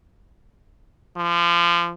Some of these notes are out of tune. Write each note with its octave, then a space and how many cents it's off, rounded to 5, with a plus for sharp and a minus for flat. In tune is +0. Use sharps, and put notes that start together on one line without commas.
F3 -25